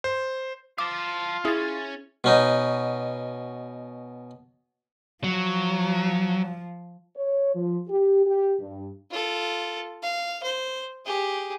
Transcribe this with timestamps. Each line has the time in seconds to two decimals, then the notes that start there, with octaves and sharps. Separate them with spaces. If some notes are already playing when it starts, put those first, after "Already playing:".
0.04 C5
0.78 F4 F5 A5 D6
1.45 C#4 E4 G#4 C#5 A6
2.24 B2 C#4 D#4
5.24 F3 F#3
7.16 C#5
7.55 F3
7.89 G4
8.26 G4
8.59 G2
9.11 F4 A4
10.02 F5
10.43 C5
11.05 G4 G#4